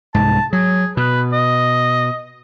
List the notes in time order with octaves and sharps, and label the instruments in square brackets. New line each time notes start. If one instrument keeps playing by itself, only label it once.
[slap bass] C2 G#2 [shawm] A5
[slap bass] F#3 [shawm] G#4
[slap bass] B2 [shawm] B4
[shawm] D#5